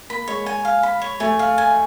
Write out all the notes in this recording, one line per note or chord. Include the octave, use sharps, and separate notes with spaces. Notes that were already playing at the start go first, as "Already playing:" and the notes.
A#3 B5
G#3 C#5
G#5
F5
B5
C#5
A3 G#5
F5
G#5